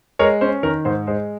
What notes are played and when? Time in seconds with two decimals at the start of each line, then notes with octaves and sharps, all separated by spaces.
0.19 G#3 A#4 C#5
0.41 C#4 C5
0.63 D#3 A#4
0.85 G#2 C5
1.07 G#3 C5